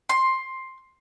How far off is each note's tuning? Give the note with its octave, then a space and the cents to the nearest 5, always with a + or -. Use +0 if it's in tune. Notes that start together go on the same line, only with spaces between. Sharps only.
C6 +10